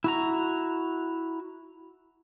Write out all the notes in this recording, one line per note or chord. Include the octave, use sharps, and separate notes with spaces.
E4 F#4 A#5